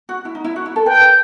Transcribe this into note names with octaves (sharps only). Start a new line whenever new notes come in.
F#4
E4
D#4
E4
F#4
E4
A4
B4 G5